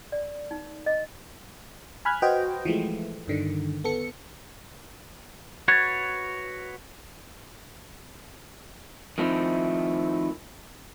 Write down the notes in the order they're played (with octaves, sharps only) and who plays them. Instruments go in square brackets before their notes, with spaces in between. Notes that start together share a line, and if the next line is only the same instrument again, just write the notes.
[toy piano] D5
D#4
D#5
[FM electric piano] G#5 B5 F6 F#6 G#6
F#4 B4 C5 D#5 G5
E3 F3 G#3 A3
G2 D3 D#3
B3 A4 C#7
[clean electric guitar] F#4 B4 C#5 [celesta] G#6 A6
[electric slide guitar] D#3 F3 A3 C4 D#4 E4